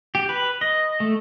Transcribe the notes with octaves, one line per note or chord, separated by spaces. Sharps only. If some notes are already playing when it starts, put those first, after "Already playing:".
G4
B4
D#5
A3